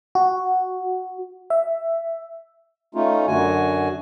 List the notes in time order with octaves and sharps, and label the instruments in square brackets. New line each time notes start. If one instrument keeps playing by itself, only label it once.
[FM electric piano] F#4
E5
[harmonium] A3 C#4 D#4 F4
F#2 D3 F#4 G#5